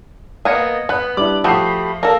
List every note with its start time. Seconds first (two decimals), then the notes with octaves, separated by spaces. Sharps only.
0.45 A#3 B3 D#5 D#6 G#6 C#7
0.89 B3 B5 F#6
1.17 G3 D4 E4 D6 F#7
1.44 F3 A3 F#4 G4 B5 D#6 G6 C7
2.03 A#3 A4 A#4 A#6